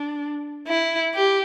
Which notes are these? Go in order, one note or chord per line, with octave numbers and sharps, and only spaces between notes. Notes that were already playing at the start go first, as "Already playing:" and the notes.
Already playing: D4
E4
G4